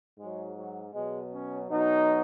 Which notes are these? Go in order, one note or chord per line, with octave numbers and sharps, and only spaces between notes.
G#2 F#3 G#3
F#3
B2 F#3 G#3
C#4
B2 F#3 D#4